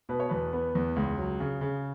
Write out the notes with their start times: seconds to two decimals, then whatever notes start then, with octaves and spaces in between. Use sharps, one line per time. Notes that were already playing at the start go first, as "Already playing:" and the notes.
0.09 B2 B4
0.20 C#5
0.29 E2 B4
0.53 B3
0.75 E2
0.96 C#2
1.18 F#3
1.40 C#3
1.61 C#3